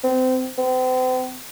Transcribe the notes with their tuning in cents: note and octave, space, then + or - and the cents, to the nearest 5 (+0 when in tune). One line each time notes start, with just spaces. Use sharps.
C4 -25
C4 -40